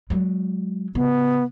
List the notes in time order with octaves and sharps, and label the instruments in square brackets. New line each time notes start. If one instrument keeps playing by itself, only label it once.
[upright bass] F#3 G#3
[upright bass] C#3 [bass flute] B3